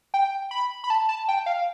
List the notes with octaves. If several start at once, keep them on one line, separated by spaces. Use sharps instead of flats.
G5
B5
B5
A5
A5
G5
F5